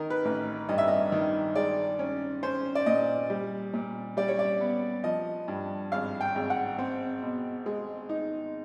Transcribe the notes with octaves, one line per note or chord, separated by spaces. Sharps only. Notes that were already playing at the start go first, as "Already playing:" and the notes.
Already playing: D#3 A#4
B4
A1
G2 D#5
E5
D#5
D#3
G#3 D5
C#4
C#4 C5
D5
A#2 D#5
G3
A#2
G3 D5
C#5
D5
B3
F3 D#5
G2
G#1 F5
G5
G#1
F#5
C4
B2
G#3
D#4